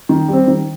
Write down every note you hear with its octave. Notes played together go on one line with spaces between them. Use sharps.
D#3
G3 C4
D#3